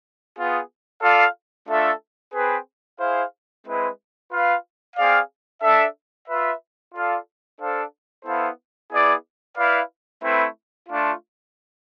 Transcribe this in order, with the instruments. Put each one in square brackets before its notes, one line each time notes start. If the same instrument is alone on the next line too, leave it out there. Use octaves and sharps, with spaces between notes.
[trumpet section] B3 F4 G#4
F4 A4 D5 F5
A3 D4 F4 A4 E5
C4 G#4 B4
E4 G#4 C5 F5
G#3 C4 E4 B4
F4 B4 F5
C4 G#4 D5 F5
D4 A4 E5
F4 B4 E5
F4 A4 D5 F5
D4 A4 C5 F5
B3 E4 A4 C5 F5
B3 E4 G#4 D5
E4 B4 D5 F5
A3 C4 E4 B4 E5
A3 D4 F4